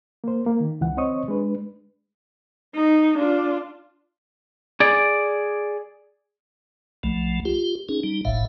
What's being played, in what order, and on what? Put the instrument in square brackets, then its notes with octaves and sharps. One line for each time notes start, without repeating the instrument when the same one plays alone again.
[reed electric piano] A#3 C5
A#3
D#3
C#2 E3 F#5
C4 C5 C#5 D#5 C#6 D#6
G#3 D4 B4
[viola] D#4
D4 F4
[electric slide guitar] G#4 D5
[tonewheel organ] B1 F3 A3
F4 G4
C#4 D#4 G#4
G3 D#4
F#1 B1 A2 E5 F5